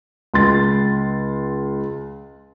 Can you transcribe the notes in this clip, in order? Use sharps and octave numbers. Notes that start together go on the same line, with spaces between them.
C#2 C6 A6